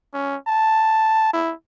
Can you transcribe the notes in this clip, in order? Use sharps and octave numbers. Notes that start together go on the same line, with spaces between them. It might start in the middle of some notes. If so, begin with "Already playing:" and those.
C#4
A5
E4